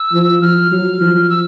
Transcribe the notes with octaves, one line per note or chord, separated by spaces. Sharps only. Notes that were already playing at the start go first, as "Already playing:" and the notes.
Already playing: E6
F3
F3 F6
F#3
F3
E6